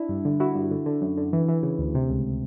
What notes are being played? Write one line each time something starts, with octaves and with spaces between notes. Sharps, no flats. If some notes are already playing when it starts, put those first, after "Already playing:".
Already playing: D4 E4
G2
D3
D3 E4 F#4
G2
D3
D3
F#2
D3
E3
E3
C#3
D2
C3
C#2